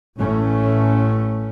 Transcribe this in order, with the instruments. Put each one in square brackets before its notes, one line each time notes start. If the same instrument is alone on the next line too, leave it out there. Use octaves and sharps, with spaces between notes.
[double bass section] A1 A2 A3 C#4